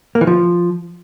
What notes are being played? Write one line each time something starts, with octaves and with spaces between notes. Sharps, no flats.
A#3
E3
F3